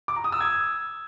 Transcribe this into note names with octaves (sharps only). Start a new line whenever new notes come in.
D6
A#5
D#6
E6
G#6